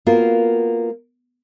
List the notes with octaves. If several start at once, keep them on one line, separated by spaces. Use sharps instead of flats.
A#3 B3 F4 F#4 A#4